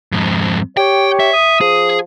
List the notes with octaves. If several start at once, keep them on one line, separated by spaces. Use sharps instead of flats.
F2 G#2
G4 C#5 G5
E5
D#6
F3 G#4